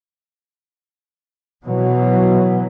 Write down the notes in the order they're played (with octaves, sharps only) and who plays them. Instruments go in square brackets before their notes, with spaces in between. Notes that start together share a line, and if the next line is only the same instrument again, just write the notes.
[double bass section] B2 E3 F#3